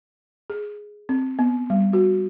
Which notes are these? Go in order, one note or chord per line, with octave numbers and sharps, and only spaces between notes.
G#4
C4
B3
G3
F#4